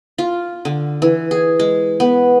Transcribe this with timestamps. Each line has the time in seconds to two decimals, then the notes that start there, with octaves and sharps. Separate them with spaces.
0.18 F4
0.65 D3
1.02 E3
1.31 G#4
1.59 G#3
2.00 B3